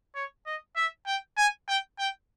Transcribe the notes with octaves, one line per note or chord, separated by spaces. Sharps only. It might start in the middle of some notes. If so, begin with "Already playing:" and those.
C#5
D#5
E5
G5
G#5
G5
G5